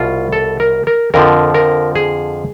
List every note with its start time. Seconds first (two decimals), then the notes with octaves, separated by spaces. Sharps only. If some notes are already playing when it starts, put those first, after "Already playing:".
Already playing: C2 B2 F4
0.33 A4
0.60 A#4
0.87 A#4
1.14 F2 D3 F3 A#4
1.54 A#4
1.96 G#4